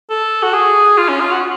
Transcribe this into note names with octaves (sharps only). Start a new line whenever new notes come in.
A4
F#4
G#4
F4
C#4
F4
F#4